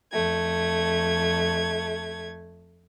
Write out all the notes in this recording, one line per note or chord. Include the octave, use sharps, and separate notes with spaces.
F2 A3 G#6